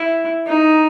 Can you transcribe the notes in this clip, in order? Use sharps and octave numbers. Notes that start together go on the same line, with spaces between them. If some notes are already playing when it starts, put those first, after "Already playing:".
Already playing: E4
D#4